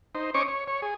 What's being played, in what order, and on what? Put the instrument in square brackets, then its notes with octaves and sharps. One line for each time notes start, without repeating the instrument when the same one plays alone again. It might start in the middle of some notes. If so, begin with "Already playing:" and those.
[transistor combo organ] D#4 C5
C#4 C5 C#5 D#5 C#6 D6
C#5
C#5
G#4